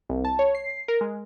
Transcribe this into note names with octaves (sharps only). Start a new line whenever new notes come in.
C2
A5
C#5
C7
A#4
G#3